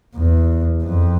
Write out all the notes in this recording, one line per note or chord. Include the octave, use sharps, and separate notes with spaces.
E2
F2